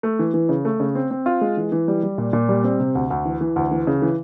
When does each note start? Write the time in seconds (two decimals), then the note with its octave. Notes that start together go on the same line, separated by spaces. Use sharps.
0.03 A3
0.19 E3
0.34 E3
0.49 C#3
0.65 A3
0.80 C#3
0.95 C4
1.11 C4
1.26 F4
1.41 G#3
1.57 E3
1.72 E3
1.88 G3
2.03 G3
2.18 A#2
2.33 A#2
2.49 G3
2.64 C4
2.80 C3
2.95 D2
3.10 D2
3.25 E3
3.41 E3
3.56 D2
3.71 E3
3.87 C#3
4.02 E3